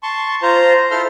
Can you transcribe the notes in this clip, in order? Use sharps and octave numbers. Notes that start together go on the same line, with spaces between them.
A5 C6 C#6
F4 C5 A#5
E4 A4 C5 C6 F6